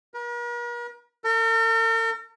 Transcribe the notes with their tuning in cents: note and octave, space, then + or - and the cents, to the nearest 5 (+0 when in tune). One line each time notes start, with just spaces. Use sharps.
A#4 +45
A#4 -45